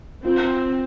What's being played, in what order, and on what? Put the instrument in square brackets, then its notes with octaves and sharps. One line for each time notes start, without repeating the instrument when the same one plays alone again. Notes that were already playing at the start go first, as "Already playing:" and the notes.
[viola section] C4 [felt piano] F4